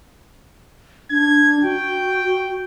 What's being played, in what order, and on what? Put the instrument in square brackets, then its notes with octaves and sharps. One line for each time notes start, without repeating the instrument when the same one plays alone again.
[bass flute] D4 [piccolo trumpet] G#6
[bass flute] F#4 [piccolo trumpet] G5